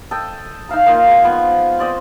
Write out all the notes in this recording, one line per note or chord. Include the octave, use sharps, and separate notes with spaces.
A4 D#5 G5
D#4 E5 F5 A#5
A#3 D#4 F4
G#3 G#5
F3 B3 G#5
C4 D5 D#5